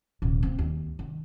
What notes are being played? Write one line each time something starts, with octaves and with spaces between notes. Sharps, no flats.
D#1 A#2
A#3 C4
D#2
D#3